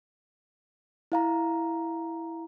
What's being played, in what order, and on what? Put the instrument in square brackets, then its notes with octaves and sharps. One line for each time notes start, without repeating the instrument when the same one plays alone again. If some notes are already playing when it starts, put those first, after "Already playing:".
[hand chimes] E4 F5 A#5